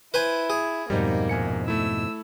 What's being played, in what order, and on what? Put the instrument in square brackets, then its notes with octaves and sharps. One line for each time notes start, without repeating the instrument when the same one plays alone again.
[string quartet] E4 [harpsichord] B4 C5 G#5
[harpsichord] G#4
[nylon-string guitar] F2 G#2 B2 [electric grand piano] G3 D#4 [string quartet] A#3
[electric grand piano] A#1 G#5 C#7
[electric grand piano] A3 E4 [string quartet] E6